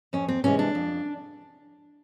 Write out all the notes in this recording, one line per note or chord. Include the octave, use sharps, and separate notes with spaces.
F2 C#4
C4
C3 E3 G#3 C#4
D4
F2